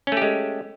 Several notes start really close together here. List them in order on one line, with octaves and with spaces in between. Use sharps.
C#4 A3 G4 G#3